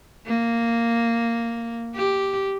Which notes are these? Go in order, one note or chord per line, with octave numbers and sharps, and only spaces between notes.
A#3
G4